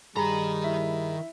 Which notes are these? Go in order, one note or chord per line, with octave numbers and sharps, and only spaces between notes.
G2 D#3 G3 G#4 A#5 B5
E4 E5